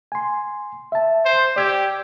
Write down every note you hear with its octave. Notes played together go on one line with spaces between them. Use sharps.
G#5 C6
E5 A5
C5
G4 D5 E6 G#6